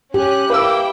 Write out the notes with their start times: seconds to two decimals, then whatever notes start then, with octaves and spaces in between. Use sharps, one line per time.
0.14 C#4 G4 F#6
0.50 A#3 E4 B4 G5 E6